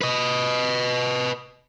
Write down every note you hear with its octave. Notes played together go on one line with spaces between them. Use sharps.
B4 D#5